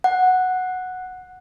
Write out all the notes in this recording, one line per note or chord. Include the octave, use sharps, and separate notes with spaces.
F#5